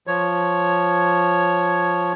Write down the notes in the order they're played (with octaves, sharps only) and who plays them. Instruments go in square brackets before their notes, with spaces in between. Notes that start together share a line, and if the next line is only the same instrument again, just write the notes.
[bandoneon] F3 C#5